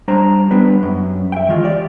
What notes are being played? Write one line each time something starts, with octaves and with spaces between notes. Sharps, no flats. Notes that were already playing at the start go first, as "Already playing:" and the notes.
G3 D4 C5 A#5
G3 B3 D4 B4
F#2
E5 G5
D#3 E3 G#3 F4
G4 D5